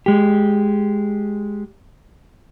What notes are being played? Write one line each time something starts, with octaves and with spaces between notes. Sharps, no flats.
G#3 G4